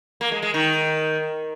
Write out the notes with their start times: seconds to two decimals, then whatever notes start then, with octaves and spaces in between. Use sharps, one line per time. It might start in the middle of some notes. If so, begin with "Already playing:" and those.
0.21 A#3
0.32 G#3
0.42 G#3
0.54 D#3